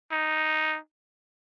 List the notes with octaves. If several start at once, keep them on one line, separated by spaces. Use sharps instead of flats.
D#4